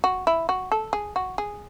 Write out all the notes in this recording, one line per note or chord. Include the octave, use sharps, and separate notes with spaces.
F#4
E4
F#4
A4
G#4
F#4
G#4